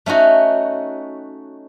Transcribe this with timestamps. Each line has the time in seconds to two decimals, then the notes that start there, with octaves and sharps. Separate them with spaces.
0.06 A3 C#4 D#4 F#4